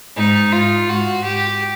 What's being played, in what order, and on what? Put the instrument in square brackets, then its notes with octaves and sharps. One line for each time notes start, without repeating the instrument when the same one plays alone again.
[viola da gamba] G#2 [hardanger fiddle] D#4
[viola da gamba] G#2 [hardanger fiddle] F4
[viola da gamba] G#2 [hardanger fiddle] F#4
[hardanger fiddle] G4